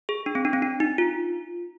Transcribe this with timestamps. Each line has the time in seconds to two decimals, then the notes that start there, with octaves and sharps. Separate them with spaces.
0.09 G#4
0.26 D4
0.35 C4
0.45 D4
0.53 C4
0.62 D4
0.80 D#4
0.98 F4